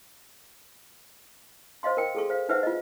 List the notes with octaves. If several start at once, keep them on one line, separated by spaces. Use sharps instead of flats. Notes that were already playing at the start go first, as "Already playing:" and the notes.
C5 D#5 F5 C6
A#4 G5
G#4 A4 C#6
C5 F5
D#4 B4 C5 E5 F#5
F4 D#5